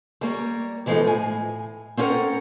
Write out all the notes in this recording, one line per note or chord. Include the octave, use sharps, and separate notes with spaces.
G3 A#3 C#5
B2 E3 F3 G#3 D#4 A4
A2 G#5
C4 C#4 F4 A4 A#4 F#5